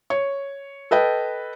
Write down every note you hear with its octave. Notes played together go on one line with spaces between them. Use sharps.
C#5
A4 B4 D#5 G5